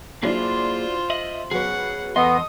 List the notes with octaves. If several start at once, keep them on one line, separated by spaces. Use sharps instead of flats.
F#3 A#3 D4 E4 F4 G#4 C5
D#5 E5 F#7
F#3 B3 G#4 C#5 F#5
E2 B3 A4 D#5 C6 D#6